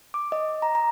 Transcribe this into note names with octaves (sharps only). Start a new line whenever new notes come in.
D6
D#5
A#5
A#5